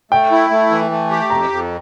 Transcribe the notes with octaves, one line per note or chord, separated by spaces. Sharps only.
A3 G5
E4
A3
E3
A3
G4
F2 A#5
F2